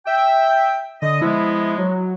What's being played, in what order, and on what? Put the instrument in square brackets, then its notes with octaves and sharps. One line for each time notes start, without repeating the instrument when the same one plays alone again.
[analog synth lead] E5 [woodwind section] G5
[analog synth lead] D3 [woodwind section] D#5
[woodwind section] F3 G#3 B3 [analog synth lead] E4
[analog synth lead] F#3